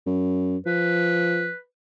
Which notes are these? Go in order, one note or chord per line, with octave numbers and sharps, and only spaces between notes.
F#2
F3 B4